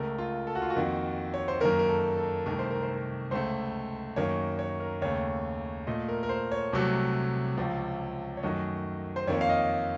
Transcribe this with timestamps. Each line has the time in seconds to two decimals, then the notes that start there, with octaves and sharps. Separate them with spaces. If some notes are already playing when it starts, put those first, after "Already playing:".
Already playing: C#2 C#3 A3 A#4
0.18 F4
0.47 A4
0.55 F#4
0.62 F4
0.70 F#4
0.75 F2 D#3 A#3
1.34 C#5
1.48 C5
1.60 F#2 D#3 A#3 A#4
1.79 A#4
1.89 A4
2.17 A4
2.46 C2 C3 D#3 A3 A#4
2.59 C5
2.70 A#4
2.83 C5
2.94 A#4
3.31 C#2 C#3 A3 C5
4.16 F#2 D#3 A#3 C#5
4.59 C#5
4.80 A#4
5.02 D#2 C#3 A3 C#5
5.87 A#2 A3 D#5
6.08 A#4
6.23 A#4
6.29 C5
6.52 C#5
6.73 C2 C3 F#3 A3
7.57 C#2 C3 F3
8.37 C#5
8.43 F#2 D#3 F#3 A3 D#5
9.16 C5
9.27 F2 D#3 A#3 C#5
9.41 F5
9.49 D#5